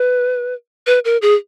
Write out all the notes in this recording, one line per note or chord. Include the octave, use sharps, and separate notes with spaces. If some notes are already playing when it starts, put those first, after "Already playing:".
Already playing: B4
B4
A#4
G#4